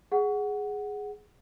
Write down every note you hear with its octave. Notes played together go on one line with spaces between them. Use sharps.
G#4 F#5